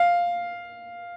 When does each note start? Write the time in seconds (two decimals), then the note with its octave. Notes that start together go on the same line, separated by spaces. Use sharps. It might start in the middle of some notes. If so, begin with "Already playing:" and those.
Already playing: F5